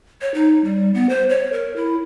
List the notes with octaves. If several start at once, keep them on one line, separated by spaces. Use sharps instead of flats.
C#5
D#4
G3
B3
C5
C#5
A#4
E4